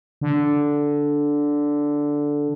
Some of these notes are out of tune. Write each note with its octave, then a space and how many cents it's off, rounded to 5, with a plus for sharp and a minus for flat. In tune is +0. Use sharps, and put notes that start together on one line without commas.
D3 -5